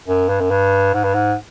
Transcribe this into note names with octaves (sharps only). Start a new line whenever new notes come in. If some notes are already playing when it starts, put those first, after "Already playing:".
F#2
G2
F#2
G2
G#2
G2
G#2